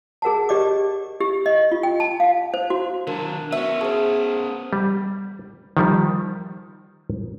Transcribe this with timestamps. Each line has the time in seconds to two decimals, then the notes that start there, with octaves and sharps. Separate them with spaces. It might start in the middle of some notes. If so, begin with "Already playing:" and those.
0.22 G#4 A#4 F#5 A5
0.49 G4 D5 D#5 D6
1.21 G4
1.46 D#5
1.72 F4
1.83 G5
2.00 A5
2.20 F5
2.54 C5
2.70 F#4
3.07 D#3 F#3 D4 A#4
3.52 B3 C#4 F#4 E5
3.81 G#4 C5 A5
4.73 G3
5.77 D#3 F3 G3